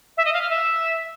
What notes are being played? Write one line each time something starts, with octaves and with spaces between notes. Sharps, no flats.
E5
D#5
F5
F6
E5